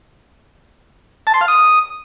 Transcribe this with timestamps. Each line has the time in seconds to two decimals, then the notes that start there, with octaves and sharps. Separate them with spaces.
1.27 A5
1.34 C6
1.41 F5
1.48 D#6